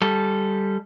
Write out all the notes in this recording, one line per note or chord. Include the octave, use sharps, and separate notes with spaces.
G3 A4